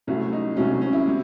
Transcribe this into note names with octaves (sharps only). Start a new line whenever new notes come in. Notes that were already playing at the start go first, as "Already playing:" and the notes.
C2 C3 F#3 A3 C#4
D#4
C2 C3 F#3 A3 C#4
C#4
E4
C3